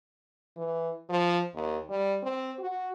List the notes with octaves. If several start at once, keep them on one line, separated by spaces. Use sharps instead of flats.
E3
F3
D#2
G3
C4
F#4